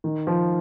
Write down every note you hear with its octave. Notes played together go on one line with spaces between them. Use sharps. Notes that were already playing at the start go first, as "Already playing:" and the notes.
D#3
F3